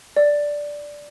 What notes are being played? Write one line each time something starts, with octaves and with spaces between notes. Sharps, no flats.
D5